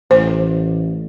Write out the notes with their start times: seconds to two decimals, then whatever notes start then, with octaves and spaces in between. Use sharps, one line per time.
0.11 A1 C5